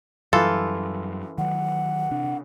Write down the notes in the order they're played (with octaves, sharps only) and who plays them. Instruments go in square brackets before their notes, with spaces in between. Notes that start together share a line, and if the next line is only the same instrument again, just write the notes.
[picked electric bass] F#2 F#3 G3 [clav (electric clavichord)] E3 A4 [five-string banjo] F4
[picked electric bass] D#3 F#3 [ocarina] F#5
[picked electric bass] C3 D4